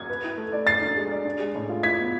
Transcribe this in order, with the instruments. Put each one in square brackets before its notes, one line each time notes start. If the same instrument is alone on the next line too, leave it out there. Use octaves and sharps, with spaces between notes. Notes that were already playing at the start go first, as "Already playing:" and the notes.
Already playing: [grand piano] G#6
[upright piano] B4
E4
A3
D5
[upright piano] A4 [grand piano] A6 C7
[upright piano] D4
G#3
D5
D4
G#3
A2
F4
[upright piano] E4 [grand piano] G#6 B6
[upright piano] B3